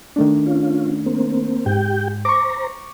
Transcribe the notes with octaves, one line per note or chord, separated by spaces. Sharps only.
D#3 A3 D4
C#4 F4
A#3 C4
G#2 G4 G5
C5 A#5 C#6 D6